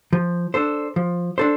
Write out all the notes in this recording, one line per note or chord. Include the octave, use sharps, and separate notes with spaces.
F3
D4 A4 C5
F3
D4 A4 C5